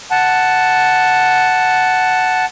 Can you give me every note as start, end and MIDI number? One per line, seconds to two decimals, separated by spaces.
0.11 2.45 78
0.11 2.45 81